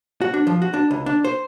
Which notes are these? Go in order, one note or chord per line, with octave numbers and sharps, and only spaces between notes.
F#4
D4
F3
F#4
D4
C#2
D4
C5